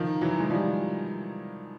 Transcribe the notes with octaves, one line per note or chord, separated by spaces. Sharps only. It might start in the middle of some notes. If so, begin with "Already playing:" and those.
Already playing: D#3 F3
E3 F#3
G#3
F3 G3